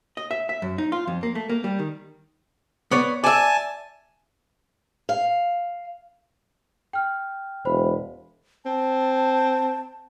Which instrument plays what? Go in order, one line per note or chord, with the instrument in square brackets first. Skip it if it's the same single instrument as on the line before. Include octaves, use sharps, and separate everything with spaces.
[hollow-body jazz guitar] D#5
E5
E5
F#2
D#4
F4
F2
A#3
A3
A#3
G3
D#3
B3 C#5 D5
[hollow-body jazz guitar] D5 E5 [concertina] G#5 A5
[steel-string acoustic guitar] F5
[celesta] G5 F6
[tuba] E1 [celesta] C5 B5
[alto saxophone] C4 [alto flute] A5